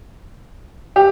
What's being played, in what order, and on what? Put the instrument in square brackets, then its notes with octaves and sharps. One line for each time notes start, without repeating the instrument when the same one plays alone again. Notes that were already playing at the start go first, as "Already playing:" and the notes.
[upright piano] G4